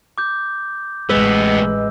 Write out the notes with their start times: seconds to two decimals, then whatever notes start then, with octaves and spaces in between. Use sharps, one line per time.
0.18 D6 G6
1.09 A1 A2 G#3 B3 B4 D#5 E6